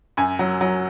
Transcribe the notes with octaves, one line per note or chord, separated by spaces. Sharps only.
F#2 G#5
F#3
F#3